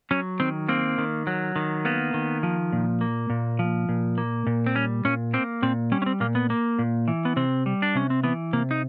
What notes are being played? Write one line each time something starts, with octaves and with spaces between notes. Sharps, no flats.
F#3 C#4
D#3 C4
A#3 C4
D#3
F#3
D#3
A#3 B3
D#3
F3
A#2
A#3
A#2
F3
A#2
A#3
A#2
C4
G3 C#4
A#2 C#4
A#3 C4
A#2 C4
G3 C#4
C#4
C4
A#2 A#3
B3
A#3
A#2
E3
B3
C3 C4
G3
D4
C3 C#4
C4
E3 B3
C3 A#3
D#4